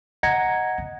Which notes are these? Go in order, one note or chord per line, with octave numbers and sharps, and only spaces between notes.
D#5 F#5 A#5 G#6 A#6 C#7